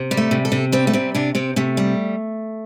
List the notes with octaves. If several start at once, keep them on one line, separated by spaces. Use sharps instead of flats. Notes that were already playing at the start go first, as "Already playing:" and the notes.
Already playing: C3
G3
A3
C3
A4
C3
G3 C4
A3
C3 C4
C3 D4
C3 C4
C3 A3
G3